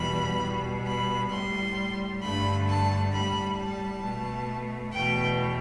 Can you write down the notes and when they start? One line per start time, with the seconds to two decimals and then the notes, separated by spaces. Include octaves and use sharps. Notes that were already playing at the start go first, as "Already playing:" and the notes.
Already playing: E2 B2 G3 B5
0.40 B2 G3
0.85 B5
1.30 A2 G3 C6
2.21 G2 D3 A3 B5
2.66 A5
3.11 A2 G3 B5
3.57 A5
4.02 B2 A3
4.92 E2 B2 A3 G5